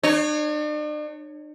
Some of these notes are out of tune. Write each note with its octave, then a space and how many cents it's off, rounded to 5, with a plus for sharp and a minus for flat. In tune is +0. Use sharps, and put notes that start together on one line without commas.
D4 +45 C#5 -5